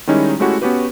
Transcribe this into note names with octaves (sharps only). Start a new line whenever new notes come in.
D#3 G3 G#3 C#4 D#4 E4
G#3 A3 C#4 E4 F#4 G4
B3 C#4 F#4 G4 B4